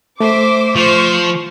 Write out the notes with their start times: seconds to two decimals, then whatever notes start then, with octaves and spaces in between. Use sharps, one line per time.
0.20 A3 C5 E5 D6
0.76 F3 C5 C#6